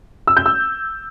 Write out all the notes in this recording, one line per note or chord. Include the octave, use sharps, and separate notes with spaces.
E6
G6
E6